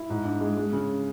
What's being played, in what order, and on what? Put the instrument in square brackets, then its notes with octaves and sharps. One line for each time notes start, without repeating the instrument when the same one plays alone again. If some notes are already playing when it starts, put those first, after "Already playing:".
Already playing: [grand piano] E4
G#2
D4
G#3
G#3
C#3